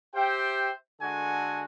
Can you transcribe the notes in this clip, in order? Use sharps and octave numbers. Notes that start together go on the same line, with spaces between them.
G4 C5 E5 G5
D3 G#3 F#4 A4 G#5